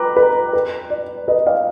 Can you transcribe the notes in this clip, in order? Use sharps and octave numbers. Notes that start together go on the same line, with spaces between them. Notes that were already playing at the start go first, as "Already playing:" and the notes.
Already playing: B4 A#5 D6
B4
B4
D5
B4 D#5
D5 F5